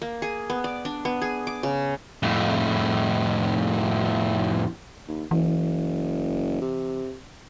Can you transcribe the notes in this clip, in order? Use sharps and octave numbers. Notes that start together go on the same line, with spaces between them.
A#3
G#4
B3
D5
D4
B3
G#4
D6
C#3
F2 A2
D#2
F#1 E3
C3